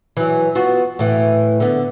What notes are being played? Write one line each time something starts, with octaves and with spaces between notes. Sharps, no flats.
E3 F#3
B3 F4 F#4
A2 E3
D3 B3